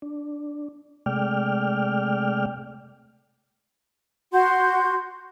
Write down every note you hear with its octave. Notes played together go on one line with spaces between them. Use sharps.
D4
C3 G#3 A3 D5 G5 F6
F#4 F#5 C6 G6